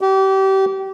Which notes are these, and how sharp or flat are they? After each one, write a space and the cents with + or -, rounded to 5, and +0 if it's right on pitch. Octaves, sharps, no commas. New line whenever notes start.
G4 -30